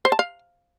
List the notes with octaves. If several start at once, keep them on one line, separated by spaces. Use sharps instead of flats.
C5
A5
F5